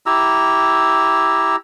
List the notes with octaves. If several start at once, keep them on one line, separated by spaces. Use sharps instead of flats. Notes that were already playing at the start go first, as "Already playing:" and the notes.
E4 G4 A#5 E6